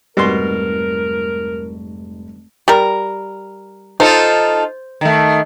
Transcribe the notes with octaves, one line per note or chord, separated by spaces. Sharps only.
F1 G#2 B2 G3 A#4 C6 G7
G3 A#4
D#4 F4 A4 C5
D#3 A3